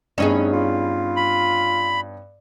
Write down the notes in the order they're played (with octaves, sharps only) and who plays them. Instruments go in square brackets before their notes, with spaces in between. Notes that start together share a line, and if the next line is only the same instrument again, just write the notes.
[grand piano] G2 B3 [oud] C#4 D#4 G#4
[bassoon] F4
[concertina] B5